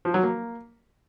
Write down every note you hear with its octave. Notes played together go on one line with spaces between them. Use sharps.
F3
F#3
A#3